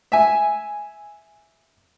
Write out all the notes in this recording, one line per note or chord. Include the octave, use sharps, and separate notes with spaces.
E5 G#5